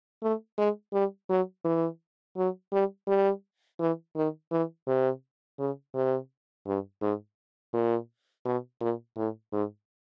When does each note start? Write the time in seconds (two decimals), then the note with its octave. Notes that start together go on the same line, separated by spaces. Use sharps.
0.22 A3
0.58 G#3
0.93 G3
1.29 F#3
1.65 E3
2.37 F#3
2.73 G3
3.08 G3
3.80 E3
4.16 D#3
4.52 E3
4.87 C3
5.59 C#3
5.95 C3
6.66 G2
7.02 G#2
7.74 A#2
8.45 B2
8.81 A#2
9.17 A2
9.53 G#2